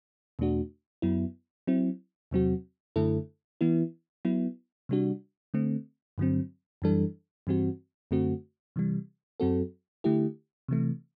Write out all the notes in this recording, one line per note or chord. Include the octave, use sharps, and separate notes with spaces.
E2 B2 A3 D4 F#4
F#2 F#3 B3 E4
F#3 C4 E4
E2 C3 F#3 C4 F#4
F#2 D3 A3 E4 A4
E3 B3 E4
F#3 B3 E4
C3 G3 D4 F#4
D3 A3 C4
G2 D3 F#3 C4
F#2 E3 G3 D4 A4
G2 E3 G3 C4 F#4
F#2 D3 A3 C4 F#4
C3 E3 G3
F#2 F#3 C4 F#4 A4
D3 A3 E4 G4
C3 E3 A3